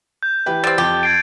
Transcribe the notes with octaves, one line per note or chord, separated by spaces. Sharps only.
G6
E3 G4 B4
G3 C4 A6
F2 G4
G#6 C7 D7